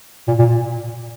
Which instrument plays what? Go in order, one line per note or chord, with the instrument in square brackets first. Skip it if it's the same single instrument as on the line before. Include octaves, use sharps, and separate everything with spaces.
[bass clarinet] A#2
A#2